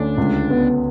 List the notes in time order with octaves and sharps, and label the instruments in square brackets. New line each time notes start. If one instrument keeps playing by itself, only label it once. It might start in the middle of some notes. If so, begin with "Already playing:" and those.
Already playing: [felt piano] D2 C#4 [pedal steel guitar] D4
[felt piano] C#2
B3